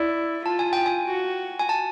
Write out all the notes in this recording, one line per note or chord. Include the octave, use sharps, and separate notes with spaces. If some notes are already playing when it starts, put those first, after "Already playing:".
Already playing: E4 D5
F4 A5
G#5
G5
G#5
F#4
G#5
A5